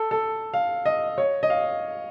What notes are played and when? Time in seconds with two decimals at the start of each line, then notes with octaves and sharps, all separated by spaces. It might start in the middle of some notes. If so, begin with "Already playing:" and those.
Already playing: A4
0.11 A4
0.54 F5
0.86 D#5
1.18 C#5
1.43 D#5
1.50 F5